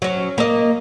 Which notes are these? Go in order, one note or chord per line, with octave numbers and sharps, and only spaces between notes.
F#3 C#4
A#3 D#5